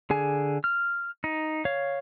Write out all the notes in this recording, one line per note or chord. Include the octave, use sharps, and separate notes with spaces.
D3 G#4 G#5
F6
D#4
C#5 F5